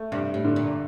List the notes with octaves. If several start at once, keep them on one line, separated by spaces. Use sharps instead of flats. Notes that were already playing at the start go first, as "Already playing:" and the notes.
Already playing: A3
G2 C3
A2
D3
A#2